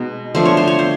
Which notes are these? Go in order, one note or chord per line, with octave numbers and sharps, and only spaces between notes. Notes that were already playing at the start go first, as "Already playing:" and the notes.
Already playing: B2 G#3 B3 D#4
D3 F3 A3 D4 C5
C#5
C5
C#5
C5